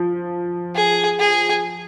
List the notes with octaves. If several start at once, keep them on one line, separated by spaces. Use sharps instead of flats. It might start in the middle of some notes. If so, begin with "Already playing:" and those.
Already playing: F3
G#4
G#4